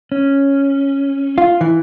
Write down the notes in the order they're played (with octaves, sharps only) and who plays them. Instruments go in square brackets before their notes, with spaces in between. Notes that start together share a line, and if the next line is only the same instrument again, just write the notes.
[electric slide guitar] C#4
[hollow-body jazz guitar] F4
E3